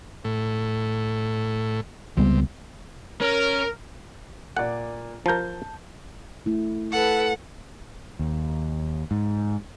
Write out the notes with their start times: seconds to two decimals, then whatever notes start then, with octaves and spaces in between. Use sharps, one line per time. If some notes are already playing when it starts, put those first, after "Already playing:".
0.24 A2
2.17 C#2 C3 G3 B3
3.21 C#4 A#4
4.57 A#2 D5 F#5
5.26 F3 A#4 A5 G6
6.46 A3 E4
6.92 A4 B4 F#5
8.19 D#2
9.11 G#2